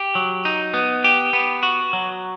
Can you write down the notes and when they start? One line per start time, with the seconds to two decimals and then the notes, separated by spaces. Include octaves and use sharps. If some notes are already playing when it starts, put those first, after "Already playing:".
Already playing: G4
0.15 F#3
0.45 D#4
0.74 B3
1.04 G4
1.33 B3
1.63 F#4
1.93 F#3